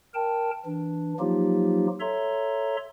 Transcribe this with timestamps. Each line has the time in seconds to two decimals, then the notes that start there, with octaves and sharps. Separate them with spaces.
0.14 A#4 G5 A5
0.66 E3 D4
1.19 F3 F#3 A#3 D#4 F4 G4
2.00 A4 C#5 E5 A#5 C6